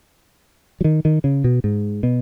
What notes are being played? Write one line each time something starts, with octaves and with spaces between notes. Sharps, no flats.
F#3
D#3
D#3
C#3
B2
G#2
B2